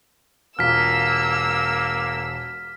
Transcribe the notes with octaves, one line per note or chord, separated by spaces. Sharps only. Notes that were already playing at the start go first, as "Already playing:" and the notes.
E1 A#3 F4 E6 F6 B6